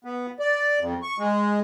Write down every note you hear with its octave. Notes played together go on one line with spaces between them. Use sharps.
B3
D5
F2
C#6
G#3